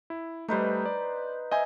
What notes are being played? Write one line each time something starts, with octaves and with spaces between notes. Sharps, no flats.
E4
G3 A3 D#4 B4 C5
D5
C5 D#5 E5 G#5